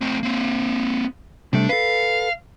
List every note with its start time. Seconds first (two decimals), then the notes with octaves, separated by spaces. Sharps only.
0.01 A3 C4
0.23 A#3 C4
1.53 C3 G3 A3 D4
1.69 A4 B4 F5